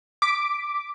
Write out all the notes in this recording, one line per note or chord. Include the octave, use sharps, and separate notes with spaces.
D6 B6